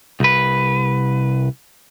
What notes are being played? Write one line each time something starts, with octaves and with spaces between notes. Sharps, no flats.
C2 B4